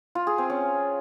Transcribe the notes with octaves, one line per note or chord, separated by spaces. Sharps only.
F4
G#4
C4
C#4